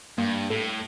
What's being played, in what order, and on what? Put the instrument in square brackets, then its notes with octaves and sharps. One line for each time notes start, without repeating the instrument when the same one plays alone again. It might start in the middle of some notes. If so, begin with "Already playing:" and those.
[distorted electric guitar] G2 [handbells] A#3
[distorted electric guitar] A2 [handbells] A4